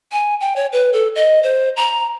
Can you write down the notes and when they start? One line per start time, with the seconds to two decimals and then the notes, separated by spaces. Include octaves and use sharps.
0.12 G#5
0.40 G5
0.56 C#5
0.73 B4
0.93 A4
1.15 D#5
1.43 C5
1.76 A#5